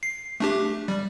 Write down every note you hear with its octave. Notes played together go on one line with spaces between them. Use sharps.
C7
A3 D4 G4
G3